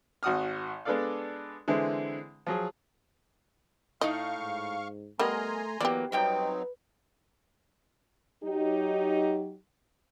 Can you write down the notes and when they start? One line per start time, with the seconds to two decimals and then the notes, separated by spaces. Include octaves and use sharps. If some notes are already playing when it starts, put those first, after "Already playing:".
0.23 G#1 F#4 F#5 D#6 F6
0.85 G#3 B3 D4 A4 D5 F5
1.68 D3 E3 G#3 C4 E4
2.47 F3 F#3 G#4
4.01 A2 D#4 D#5 F5 C#6
4.33 G#2
5.19 G3 A3 B3 A#4 D#5 G#5 A#5 C6
5.81 E3 F#3 A#3 B3 G4 D5
6.12 F#2 F#3 G3 C4 D#4 B4 G5
8.43 F#3 D#4 G4